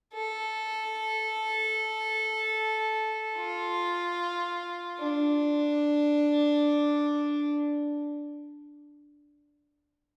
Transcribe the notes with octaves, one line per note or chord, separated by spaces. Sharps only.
A4
F4
D4